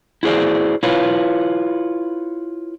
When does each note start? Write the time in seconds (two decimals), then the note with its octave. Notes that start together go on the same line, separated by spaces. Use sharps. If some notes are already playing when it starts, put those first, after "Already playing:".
0.23 E4 F#4 G#4 C5 D5
0.83 E4 F4 B4 C#5